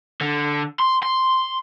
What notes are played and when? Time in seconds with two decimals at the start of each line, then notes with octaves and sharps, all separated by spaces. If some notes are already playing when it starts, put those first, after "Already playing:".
0.21 D3
0.80 C6
1.03 C6